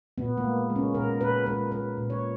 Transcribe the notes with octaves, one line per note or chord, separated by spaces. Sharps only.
A#2 B3
A#3
G#3
G#3
C#4
A#2 A#4
A#2 B4
G#3 B4
G#3 B4
A#2
C#5